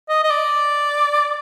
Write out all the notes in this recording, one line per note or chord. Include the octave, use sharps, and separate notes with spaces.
D#5
D#5
D5